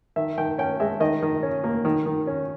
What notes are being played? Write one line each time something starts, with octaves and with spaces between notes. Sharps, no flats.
D#3 E5
D#3 G5
C#4 G5
G#3 E5
D#3 D#5
D#3
C#4
A#3
D#3
D#3
C#4